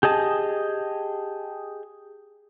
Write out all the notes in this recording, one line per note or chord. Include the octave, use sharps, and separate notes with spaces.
G4 G#4 D#5 A5